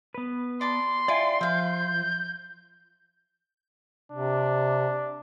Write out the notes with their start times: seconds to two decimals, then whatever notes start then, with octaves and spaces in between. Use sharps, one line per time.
0.14 B3 B4
0.61 D5 A5 B5 C6
1.08 E4 F4 D5 G5 G#5 C7
1.41 F3 E5 F5 G6
4.12 C3 D4